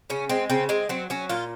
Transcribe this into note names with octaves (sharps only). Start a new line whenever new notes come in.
C#3 C#4
G#3 C4
C#3 C4
G#3 C4
F#3 C4
F#3 C#4
A#2 F4